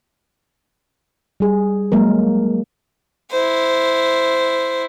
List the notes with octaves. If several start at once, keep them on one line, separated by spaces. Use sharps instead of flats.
G3 G#4
F#3 G#3 A#3 A#4
E4 C5